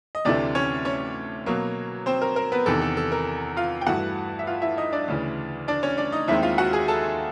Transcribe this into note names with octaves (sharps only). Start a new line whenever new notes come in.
D#5
D2 C3 E3 A3 D4 D5
C#4 C#5
C#4 C#5
B2 F#3 A#3
C4 C5
A#4
A#4
B3 B4
E2 C3 D#3 A4
A4
A4
A#4
F4 F5
G5
G2 E3 A3 F#4 F#5
E5
F4 F5
E4 E5
D#4 D#5
D4 D5
D2 C#3 E3
D4 D5
C#4 C#5
D4 D5
D#4 D#5
D#2 D#3 G#3 C4 E4 E5
F4 F5
F#4 F#5
G#4 G#5
A4 A5